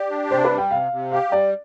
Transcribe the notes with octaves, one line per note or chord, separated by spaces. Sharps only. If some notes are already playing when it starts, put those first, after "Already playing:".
Already playing: G4 D5
D4
C3 C5
B4
G3
G5
C3 F5
C3
G4 F5
G3 D5